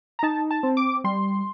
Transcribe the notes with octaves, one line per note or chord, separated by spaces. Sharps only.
A#5
D#4 A5
A5
C4
D6
G3 C6